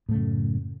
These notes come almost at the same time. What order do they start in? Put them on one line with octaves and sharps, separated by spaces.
A2 A3 C#3 F#2